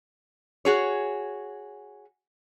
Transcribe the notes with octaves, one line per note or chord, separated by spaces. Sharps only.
F#4 G#4 C#5